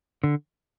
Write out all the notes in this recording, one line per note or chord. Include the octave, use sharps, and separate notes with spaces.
D3